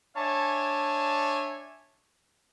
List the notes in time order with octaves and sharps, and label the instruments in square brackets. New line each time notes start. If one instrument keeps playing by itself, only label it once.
[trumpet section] D4 C#5 E5 G#5 A5